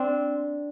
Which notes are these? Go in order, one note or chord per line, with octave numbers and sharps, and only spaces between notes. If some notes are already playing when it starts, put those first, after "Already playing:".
Already playing: C4 D4